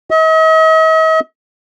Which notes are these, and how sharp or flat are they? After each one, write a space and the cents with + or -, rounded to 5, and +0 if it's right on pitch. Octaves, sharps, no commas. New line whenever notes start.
D#5 +45